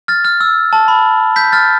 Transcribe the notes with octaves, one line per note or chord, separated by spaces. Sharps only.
F6 A6
F6
E6
A5
B5
G6 B6
F6 A6